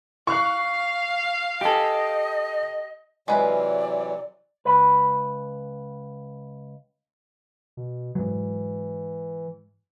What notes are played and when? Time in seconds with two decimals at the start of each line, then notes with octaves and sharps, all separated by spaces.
0.27 F5 C#6 F#6
1.61 G4 A4 D#5
3.28 C3 E3 F#3 G#3 F4 B4 D5
4.65 C#2 B4
7.77 B2
8.15 G#2 E3 F#3